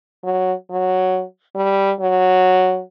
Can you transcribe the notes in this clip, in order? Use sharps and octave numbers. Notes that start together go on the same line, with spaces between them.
F#3
F#3
G3
F#3